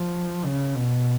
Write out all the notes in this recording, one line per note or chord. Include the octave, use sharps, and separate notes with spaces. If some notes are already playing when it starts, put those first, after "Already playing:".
Already playing: F3
C#3
B2